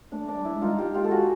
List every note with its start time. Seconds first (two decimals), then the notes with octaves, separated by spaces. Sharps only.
0.12 A3 D4
0.28 D4
0.34 G3
0.45 E4
0.56 G#3
0.62 D#4 F4
0.78 F4 G4
0.94 F4 G4
1.04 A4
1.11 F#4 G#4